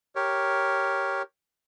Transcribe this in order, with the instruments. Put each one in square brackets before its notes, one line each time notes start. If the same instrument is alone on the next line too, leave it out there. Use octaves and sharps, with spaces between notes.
[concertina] G4 A#4 C#5